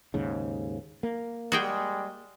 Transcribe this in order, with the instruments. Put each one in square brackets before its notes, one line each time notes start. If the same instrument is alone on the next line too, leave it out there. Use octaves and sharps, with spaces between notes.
[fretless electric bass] D#2 G#2 C#3
A#3
[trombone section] G3 G#3 [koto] F#4 G#4 G5